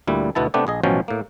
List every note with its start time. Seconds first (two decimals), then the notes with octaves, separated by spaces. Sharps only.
0.07 D2 A#2 G3 E4
0.35 D2 B2 B3 E4 A5
0.54 C3 A3 B3 D4 G4
0.67 A#1 G#4 D#5
0.83 A1 B2 F3 F#3 C#4 G5
1.08 A2 A#3